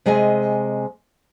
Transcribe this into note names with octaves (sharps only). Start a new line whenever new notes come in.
C3 G#3 D#5 G#5